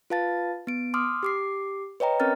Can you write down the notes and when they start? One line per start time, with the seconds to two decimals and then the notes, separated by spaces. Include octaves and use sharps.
0.10 F4 B4 F5 A5 A6
0.67 B3 D7
0.94 C6 D6 D#6 F6
1.23 G4 D6 C7
2.00 B4 C#5 D#5 G5 A#5
2.20 C4 C#4 A#4 F6 A6